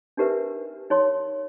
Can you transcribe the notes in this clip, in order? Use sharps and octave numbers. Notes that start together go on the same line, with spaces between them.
D4 D#4 G4 A#4 B4 E5
D#4 C#5 C6